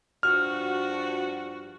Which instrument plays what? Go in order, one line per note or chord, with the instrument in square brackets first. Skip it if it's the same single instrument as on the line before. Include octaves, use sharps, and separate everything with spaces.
[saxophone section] G2 F3 F#4 [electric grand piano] F6